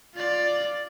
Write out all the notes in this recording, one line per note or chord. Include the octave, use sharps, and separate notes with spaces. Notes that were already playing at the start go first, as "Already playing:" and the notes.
F4 D5